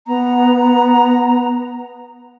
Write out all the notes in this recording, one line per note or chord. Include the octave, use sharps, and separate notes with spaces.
B3 A#5